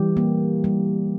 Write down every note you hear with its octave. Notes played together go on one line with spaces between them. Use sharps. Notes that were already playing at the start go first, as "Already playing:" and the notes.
Already playing: E3 G3 G4
A#3
G3